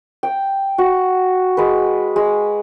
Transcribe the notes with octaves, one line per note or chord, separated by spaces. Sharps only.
G5
F#4
G#3 B4
G#3